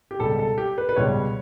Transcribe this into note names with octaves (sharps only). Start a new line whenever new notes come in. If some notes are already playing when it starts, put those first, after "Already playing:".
G4
C#2 B2 G3 A4
A4
G4
B4
B4
C#2 B2 G3 C#5